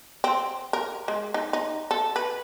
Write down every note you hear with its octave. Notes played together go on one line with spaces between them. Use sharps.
C4
A#4
G#3
D#4
D#4
A4
B4